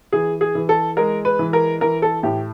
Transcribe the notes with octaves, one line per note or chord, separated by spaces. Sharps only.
E3 G#4
G#4
E3
A4
G#3 A#4
B4
E3
A#4
E3 A#4
A4
A2 G4